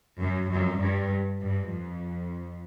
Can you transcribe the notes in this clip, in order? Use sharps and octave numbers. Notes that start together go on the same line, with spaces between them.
F#2
F#2
G2
G2
F2